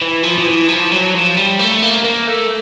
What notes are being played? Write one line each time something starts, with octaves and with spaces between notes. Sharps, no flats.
E3
F3
F3
E3
F3
F#3
F3
G3
A3
A#3
A#3
A3